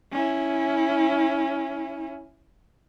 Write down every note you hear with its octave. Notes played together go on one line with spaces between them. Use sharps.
C#4 E4